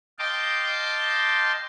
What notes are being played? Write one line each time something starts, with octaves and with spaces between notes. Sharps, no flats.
D#5 F5 G5 A5 C6 D6